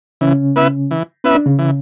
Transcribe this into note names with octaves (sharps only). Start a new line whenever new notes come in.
C#3 E3 C#4
B3 E4 B4 E5
E3
B3 C#4 E4 B4 E5
D4
C#3 C#4
E3